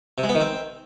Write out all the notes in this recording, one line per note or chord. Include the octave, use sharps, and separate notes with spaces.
C3
G#3
B3
D#3
C4